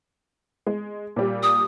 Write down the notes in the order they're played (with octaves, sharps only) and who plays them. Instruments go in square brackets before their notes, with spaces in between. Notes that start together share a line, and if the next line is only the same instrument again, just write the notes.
[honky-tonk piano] G#3
A#2 G3
[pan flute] D#6